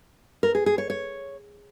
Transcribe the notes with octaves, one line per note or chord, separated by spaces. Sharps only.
A#4
G#4
G#4
C#5
C#5